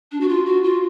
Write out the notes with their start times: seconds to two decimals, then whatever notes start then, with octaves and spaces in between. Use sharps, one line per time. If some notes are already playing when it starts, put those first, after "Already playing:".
0.12 D4
0.21 F#4
0.29 F4
0.46 F#4
0.63 F4